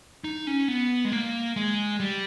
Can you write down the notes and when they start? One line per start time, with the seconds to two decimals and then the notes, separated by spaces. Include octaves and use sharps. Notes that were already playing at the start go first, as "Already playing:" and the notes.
0.24 D#4
0.47 C#4
0.68 B3
1.05 G#3
1.12 A#3
1.56 G#3
2.00 G3